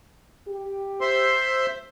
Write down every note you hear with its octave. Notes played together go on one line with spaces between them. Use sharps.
G4
C5 E5 C6